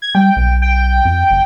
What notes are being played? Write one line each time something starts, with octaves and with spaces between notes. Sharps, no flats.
G#6
G3 G5
B1
G5
F2
F#1